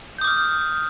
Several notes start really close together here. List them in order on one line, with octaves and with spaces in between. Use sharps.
G6 D#6 D6 F6